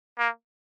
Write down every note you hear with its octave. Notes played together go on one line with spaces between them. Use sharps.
A#3